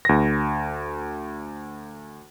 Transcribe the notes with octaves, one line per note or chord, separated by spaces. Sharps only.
D2 A#6